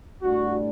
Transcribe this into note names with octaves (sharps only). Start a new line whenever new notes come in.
A2 G3 D4 F#4